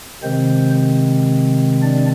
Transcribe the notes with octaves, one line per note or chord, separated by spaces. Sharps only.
C3 D#3 G#3 C4 C5
D4 D5